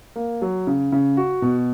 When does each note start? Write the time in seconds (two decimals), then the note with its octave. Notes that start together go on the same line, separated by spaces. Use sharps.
0.16 A#3
0.42 F#3
0.67 C#3
0.92 C#3
1.17 F#4
1.42 B2